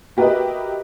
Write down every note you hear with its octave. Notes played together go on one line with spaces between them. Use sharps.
F#4 G4 A#4 B4 D#5 E5